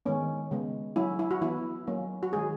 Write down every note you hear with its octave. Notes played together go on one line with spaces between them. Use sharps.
D#3 G#3 B3 C#4
C#3 G#3 B3
F#3 C#4 E4
E4
F#4
E3 B3 E4
F#3 A#3 C#4
F#4
D#3 G#3 C#4 G#4